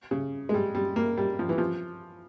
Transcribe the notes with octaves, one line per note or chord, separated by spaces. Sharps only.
C#3
G#3
G3
G3
A#3
G3
F3
E3
F3